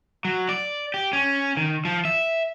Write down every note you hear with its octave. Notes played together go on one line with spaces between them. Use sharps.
F#3
D5
G4
C#4
D#3
F3
E5